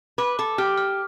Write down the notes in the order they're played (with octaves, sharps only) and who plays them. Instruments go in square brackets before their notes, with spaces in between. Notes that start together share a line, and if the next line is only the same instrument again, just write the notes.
[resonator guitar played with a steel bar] B4 [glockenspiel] D6
[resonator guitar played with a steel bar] A4 [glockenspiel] D6
[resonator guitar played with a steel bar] G4 [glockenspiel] F6
[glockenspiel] F6